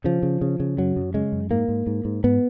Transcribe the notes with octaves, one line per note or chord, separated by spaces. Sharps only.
C#3 F3
C#3
C#3
C#3
F#2 F#3
F#2
C#3 G#3
F#2
G#2 A#3
G#2
G#2
G#2
G#2 B3